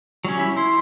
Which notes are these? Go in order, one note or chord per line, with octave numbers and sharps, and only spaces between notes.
F#3 G3 C#4
E4 E5 B5
E4 C6